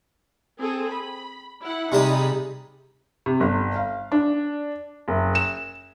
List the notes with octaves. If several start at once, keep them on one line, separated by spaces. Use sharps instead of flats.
C4 G#4 A4
B5
E4 F#5
C3 G3 D#4 G#4 A5 B5
C3
G1
F5
D4
F#1
E7